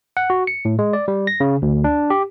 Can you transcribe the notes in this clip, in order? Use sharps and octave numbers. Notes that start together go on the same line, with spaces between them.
F#5
F#4
C#7
A2
G#3
D5
G3
A#6
C#3
D2
D4
G4